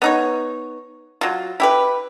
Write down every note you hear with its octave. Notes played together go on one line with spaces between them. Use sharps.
B3 D#4 C#5
F#3 F4
E4 G4 B4